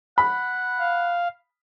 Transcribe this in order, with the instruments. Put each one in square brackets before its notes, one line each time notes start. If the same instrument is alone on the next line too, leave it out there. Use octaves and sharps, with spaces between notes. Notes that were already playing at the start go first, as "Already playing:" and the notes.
[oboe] F#5 [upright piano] B5
[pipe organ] F5